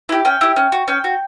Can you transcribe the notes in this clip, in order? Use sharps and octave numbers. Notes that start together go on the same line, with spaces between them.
E4 G4
C#4 G5
E4 G4
C#4
F#4
C#4 G5
F#4